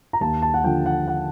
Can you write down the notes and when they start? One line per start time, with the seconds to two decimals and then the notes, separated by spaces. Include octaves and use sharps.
0.13 A#5
0.21 D#2 A5
0.42 A5
0.54 F#5
0.64 D3 F3 G5
0.86 F#5
1.08 F#5